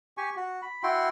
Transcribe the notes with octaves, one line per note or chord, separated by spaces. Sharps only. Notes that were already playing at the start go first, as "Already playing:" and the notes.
G4 G#5 C#6
F#4
B5
E4 F#4 G5 C6